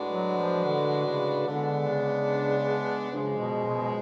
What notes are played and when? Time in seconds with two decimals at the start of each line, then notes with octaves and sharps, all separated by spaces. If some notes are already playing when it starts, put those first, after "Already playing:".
Already playing: A2 G#3 D4 F#4 B4
0.10 F#3
0.37 F3
0.65 D3
1.06 C#3
1.47 D3 G#3 B3 D4
1.88 C#3
3.11 F#2 C#3 F3 G#3
3.39 B2
3.66 B2